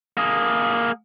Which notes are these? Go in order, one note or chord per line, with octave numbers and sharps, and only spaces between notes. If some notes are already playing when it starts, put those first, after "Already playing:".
A#3 G#4